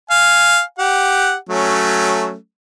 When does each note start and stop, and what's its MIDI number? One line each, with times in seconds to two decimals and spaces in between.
0.10 0.61 77
0.10 0.61 80
0.79 1.35 67
0.79 1.35 78
1.49 2.35 54
1.49 2.35 57
1.49 2.35 61